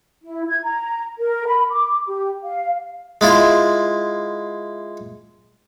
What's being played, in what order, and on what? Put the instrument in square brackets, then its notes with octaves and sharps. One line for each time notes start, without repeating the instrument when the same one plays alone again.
[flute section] E4
G#6
A#5
A#4
B5
D6
G4
F5
[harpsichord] G#3 E4 F4